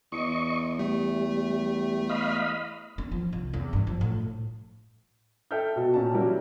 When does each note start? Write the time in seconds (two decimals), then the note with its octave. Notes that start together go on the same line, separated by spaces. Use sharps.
0.12 E2 D#5 C#6
0.79 G3 A3
2.09 D#5 F5 B5
2.98 C#4
3.12 F3
3.33 C2
3.53 E2
3.73 G2
3.87 F3
4.01 A2
5.51 A4 E5 G5 F6 G6
5.76 B2 F#4 A5
5.94 A#2 C#4 A5
6.15 F#3 G3 E4 F#4 A#4